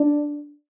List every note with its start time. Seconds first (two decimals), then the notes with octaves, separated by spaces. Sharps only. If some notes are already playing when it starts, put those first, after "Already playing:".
Already playing: D4